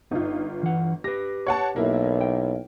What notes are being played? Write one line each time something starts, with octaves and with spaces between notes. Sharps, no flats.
G1 D#4 F4
E3 F#5
G4 B4 A#6
C#5 F#5 A5
B1 A#3 E4
G5